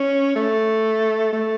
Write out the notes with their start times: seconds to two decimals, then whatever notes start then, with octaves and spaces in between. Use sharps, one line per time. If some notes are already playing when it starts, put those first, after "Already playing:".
Already playing: C#4
0.35 A3
1.33 A3